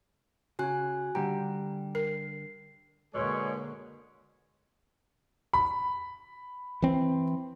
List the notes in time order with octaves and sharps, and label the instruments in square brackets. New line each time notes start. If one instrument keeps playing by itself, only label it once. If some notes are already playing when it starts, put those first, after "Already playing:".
[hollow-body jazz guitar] C#3 [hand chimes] F#4 G#5 F#6
[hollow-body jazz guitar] D3 G3 G4 [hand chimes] A#5
[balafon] A#4 [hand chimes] C7
[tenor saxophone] B2 [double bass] D3 A#3 [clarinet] G#3 [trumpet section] G#4 C#5
[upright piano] B5
[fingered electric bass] E3 C4